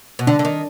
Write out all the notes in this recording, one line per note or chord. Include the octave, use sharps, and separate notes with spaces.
B2
D3 D4
D3
D#3